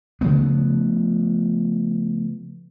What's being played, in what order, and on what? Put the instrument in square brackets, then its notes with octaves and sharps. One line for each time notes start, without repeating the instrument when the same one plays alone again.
[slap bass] C#3 F3 A3 B3